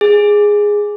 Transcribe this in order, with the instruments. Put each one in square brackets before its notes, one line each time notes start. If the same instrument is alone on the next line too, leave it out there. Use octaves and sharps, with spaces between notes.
[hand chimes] G#4